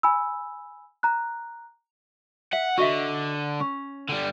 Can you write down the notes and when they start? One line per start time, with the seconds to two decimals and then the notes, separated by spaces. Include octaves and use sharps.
0.03 G#5 B5 E6
1.03 A#5 F#6
2.53 E5 F#5
2.78 D3 F#4 D#5 E5
3.60 C#4
4.10 D3 G3